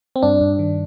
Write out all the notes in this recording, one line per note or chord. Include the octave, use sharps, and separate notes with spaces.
C4
G2 D4
G2
D#3